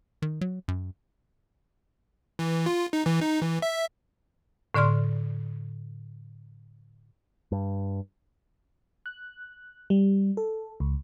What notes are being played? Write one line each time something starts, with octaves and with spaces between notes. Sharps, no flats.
D#3
F#3
F#2
E3
F4
D#4
E3
D#4
E3
E5
A2 D3 D5 C6 F6
G2
F#6
G3
A4
C#2